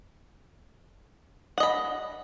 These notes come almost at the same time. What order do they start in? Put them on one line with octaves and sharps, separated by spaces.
F#5 D#5 B5